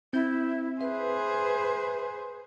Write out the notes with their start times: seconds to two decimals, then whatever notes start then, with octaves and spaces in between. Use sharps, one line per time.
0.13 C4 E4 G6
0.81 G#4 B4 C5 E5